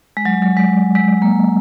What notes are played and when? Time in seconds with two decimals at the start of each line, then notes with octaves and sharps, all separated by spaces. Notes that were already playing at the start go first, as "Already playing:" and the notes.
0.17 G#3
0.25 F#3
0.42 F#3
0.57 G#3
0.95 G#3
1.22 A#3